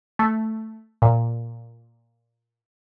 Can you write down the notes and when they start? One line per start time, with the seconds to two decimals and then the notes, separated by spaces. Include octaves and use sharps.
0.19 A3
1.02 A#2